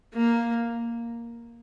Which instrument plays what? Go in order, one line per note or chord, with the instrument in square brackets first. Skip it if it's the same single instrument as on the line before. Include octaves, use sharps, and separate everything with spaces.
[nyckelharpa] A#3